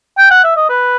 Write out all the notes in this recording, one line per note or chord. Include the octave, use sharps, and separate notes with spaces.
G5
F#5
E5
D#5
B4